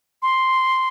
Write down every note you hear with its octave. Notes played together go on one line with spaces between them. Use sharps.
C6